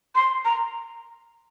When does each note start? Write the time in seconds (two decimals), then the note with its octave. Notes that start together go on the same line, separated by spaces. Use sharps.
0.15 C6
0.45 A#5